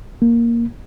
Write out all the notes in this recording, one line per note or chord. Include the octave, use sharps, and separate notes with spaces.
A#3